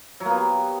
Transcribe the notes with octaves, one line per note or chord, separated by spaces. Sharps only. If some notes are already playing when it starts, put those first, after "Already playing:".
F#3
A#3
B3
G4